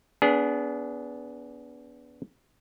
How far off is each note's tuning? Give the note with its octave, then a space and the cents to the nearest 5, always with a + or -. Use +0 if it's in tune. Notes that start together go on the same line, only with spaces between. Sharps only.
B3 +0 D4 -30 G#4 +5